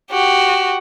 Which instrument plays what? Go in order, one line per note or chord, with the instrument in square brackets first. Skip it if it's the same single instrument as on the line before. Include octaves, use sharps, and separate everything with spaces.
[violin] F#4 G4